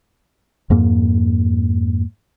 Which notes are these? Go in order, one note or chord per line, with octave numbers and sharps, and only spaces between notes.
F2 G#2 A#3